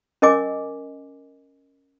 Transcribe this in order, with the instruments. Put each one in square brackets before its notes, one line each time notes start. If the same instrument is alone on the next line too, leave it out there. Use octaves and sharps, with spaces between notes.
[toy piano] C#4 A#4 D#5 G#5 D6